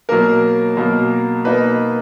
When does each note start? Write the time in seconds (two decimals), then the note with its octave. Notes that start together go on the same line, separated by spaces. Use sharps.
0.09 B2 F#3 A#3 A#4
0.77 B2 F#3 A#3
1.45 B2 A#3 D#4 B4